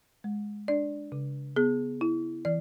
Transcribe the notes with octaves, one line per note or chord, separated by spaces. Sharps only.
G#3
D4 D5
C#3
B3 G#4
E4
E3 D5